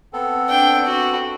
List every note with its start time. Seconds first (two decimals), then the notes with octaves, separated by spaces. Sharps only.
0.13 B3 C4 A4
0.48 D4 G5
0.85 F#4